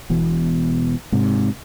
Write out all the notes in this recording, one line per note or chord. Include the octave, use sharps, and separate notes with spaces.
E1 E2 B2
G#2 C3